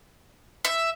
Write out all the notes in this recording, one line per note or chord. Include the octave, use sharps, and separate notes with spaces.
E5